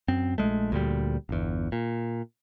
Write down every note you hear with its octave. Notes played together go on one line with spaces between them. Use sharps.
F#2 C4
A#1 F2 G#3 A3
D2 A#2 G3
G1 E2
A#2